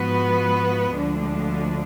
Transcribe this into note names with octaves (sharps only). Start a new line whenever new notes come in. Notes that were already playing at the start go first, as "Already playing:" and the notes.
Already playing: G#2 F3 B3 F#4 B4
D2 D3 F3 G#3 D4